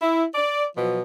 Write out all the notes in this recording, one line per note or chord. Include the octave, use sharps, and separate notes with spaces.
E4
D5
B2 F3 F#3